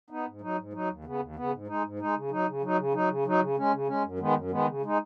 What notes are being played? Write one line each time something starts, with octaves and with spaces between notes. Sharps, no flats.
B3 D#4
G#2
F#3 D#4
G#2
F#3 D#4
D#2
C#3 B3
D#2
C#3 B3
G#2
G#3 D#4
G#2
G#3 D#4
C#3
F#3 D#4
C#3
F#3 D#4
C#3
F#3 D#4
C#3
F#3 D#4
C#3
G#3 C#4
C#3
G#3 C#4
F#2
D#3 G#3 B3
F#2
D#3 G#3 B3
C#3
G#3 D#4